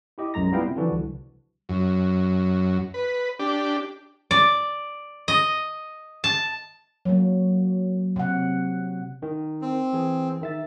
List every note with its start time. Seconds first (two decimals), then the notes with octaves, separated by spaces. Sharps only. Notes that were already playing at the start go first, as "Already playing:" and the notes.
0.18 E4 G4 D#5
0.34 B1 F#2 G#3 A#5 A#6
0.52 G3 B3 E4 F4 F5 G5
0.64 C3
0.76 D3 E3 F3 D4 F#4
0.92 C2
1.69 F#2
2.94 B4
3.39 D4 G4
4.31 D5
5.28 D#5
6.24 A5
7.05 F#3 A#3
8.16 C3 F#5
9.22 D#3
9.62 C4
9.93 E3 G#4
10.41 D#3 E5 A6